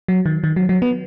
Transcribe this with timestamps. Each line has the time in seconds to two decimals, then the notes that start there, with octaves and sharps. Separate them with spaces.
0.08 F#3
0.26 D#3
0.44 D#3
0.56 F#3
0.69 F#3
0.82 B3